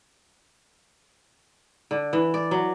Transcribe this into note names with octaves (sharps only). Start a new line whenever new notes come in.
D3
E3
D5
F#3